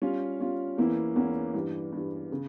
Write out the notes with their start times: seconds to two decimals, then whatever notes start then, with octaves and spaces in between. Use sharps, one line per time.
0.02 G3 C#4 F4
0.39 G3 C#4 F4
0.77 E2 E3 A#3 C#4 E4
1.16 E2 E3 A#3 C#4 E4
1.54 G2 E3 G3
1.92 G2 E3 G3
2.32 C#3